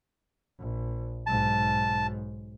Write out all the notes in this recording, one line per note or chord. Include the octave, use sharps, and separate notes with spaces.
A#1
B1 G#2 A5